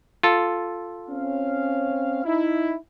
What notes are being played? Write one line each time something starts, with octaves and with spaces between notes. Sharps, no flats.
F4 A4
C4 C#4 F5
D#4 E4